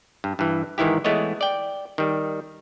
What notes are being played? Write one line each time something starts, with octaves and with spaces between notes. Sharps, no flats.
G2
G2 E3
G#2 D#3 E3 E4 G4
E3 G#3 A3 B3 C#5 D#5
D5 G5
D#3 G3